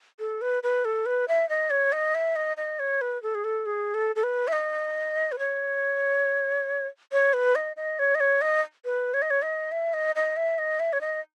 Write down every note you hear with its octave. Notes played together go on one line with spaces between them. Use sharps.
A4
B4
B4
A4
B4
E5
D#5
C#5
D#5
E5
D#5
D#5
C#5
B4
A4
G#4
A4
G#4
A4
A4
B4
E5
D#5
B4
C#5
C#5
B4
D#5
D#5
C#5
D#5
C#5
D#5
B4
C#5
D#5
C#5
D#5
E5
D#5
D#5
E5
D#5
E5
C#5
D#5